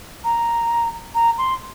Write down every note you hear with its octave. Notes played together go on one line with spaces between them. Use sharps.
A#5
A#5
C6